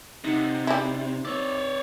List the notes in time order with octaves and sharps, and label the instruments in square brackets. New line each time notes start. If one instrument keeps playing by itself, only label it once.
[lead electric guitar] C3 [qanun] D#4 F#5
[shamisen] G3 E4
[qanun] C4 [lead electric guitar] C#5 D5